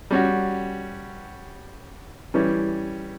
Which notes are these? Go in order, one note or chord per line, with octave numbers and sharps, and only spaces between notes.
G3 C#4 F#4
E3 G3 C#4